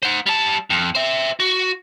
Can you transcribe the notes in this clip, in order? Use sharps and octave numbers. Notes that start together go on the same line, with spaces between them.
C5 F#5
G3 A5
F2
C5 E5
F#4